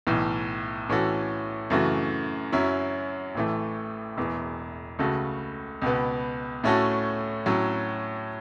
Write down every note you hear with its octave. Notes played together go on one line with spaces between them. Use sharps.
B1 A2 E3
A2 E3 C#4 F#4 A4
F#2 C#3 E3 A3 F#4
F#2 F#3 C#4 E4
A1 A2 E3 A3
E1 E2 E3
C#2 C#3 A3 F#4 A4
C#2 B2 B3
A2 A3 C#4 F#4 A4
A2 F#3 C#4